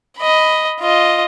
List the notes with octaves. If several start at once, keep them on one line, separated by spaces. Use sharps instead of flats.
D#5 B5
F4 D#5